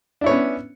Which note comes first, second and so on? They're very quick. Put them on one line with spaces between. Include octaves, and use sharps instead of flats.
D4 E4 C#5 B3 C#4